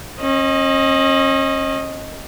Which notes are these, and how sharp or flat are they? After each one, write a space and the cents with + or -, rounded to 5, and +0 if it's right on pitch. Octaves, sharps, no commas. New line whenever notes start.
C#4 -40 D#5 +0